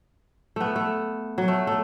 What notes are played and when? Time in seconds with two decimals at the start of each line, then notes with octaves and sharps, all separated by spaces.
0.56 A3 B3
0.76 A3
1.38 F#3
1.48 A3
1.67 A3